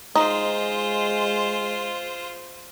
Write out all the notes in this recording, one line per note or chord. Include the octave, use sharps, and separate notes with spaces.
G#3 D#4 F4 C5